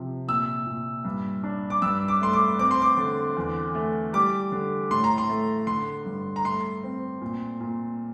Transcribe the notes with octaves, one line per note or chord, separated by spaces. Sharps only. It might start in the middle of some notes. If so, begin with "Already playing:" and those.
Already playing: C3 F3
A#2 E6
A#2
G2
D4
D6
G2 E6
D6
A3 C6
D6
C4 D6
C6
D6
D3
E2
A3
G3 D6
D3
A2 C6
A#5
C6
A3
D3 C6
G2
A#5
A3 C6
C4
A#2
A#2